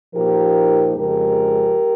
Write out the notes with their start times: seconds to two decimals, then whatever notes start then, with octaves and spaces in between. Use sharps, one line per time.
0.15 A#2 F3 A#3 D#4 G4 A#4
0.96 F2 C#3 F3 G#3 G4 A#4